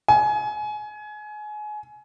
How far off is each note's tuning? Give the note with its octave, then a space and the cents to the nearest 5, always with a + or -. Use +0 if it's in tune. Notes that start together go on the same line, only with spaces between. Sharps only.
G#5 +25